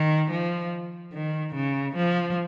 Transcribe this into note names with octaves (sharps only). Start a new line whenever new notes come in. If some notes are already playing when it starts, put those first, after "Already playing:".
Already playing: D#3
F3
D#3
C#3
F3